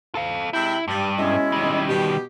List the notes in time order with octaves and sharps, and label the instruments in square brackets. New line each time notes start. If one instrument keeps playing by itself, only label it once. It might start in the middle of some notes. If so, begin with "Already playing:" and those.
[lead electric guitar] A4 F5
[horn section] C3 G#3 G5 [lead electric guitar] E4
[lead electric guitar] G2 [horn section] G3
[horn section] B2 G#3 E4 [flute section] C#4 D#5
[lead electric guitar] D#3 G3
[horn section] B2 G4